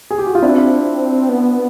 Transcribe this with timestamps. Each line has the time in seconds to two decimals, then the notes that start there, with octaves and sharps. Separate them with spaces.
0.11 G#4
0.18 G4
0.27 F#4
0.35 F4
0.42 C4 D4 E4
1.29 B3